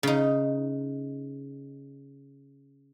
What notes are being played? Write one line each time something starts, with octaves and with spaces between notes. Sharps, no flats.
C#3 D#4